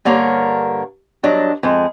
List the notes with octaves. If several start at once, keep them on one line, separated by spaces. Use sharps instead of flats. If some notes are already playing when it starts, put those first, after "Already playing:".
G2 D3 A#3 A#4 C#5
G2 F#3 D4 D#5
F2 G#3